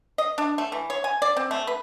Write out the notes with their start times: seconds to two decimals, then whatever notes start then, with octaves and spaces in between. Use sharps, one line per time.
0.18 D#5
0.38 D4
0.58 A3
0.72 E3
0.90 C#5
1.04 G#5
1.22 D5
1.37 C4
1.51 A3
1.67 B4